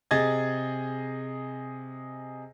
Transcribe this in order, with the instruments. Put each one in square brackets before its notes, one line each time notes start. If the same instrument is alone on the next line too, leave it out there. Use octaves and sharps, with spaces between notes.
[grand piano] C3 G#4 D#5 G#6 A6